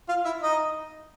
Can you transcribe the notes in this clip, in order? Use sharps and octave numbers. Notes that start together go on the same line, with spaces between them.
F4 F5
E4 E5
D#4 D#5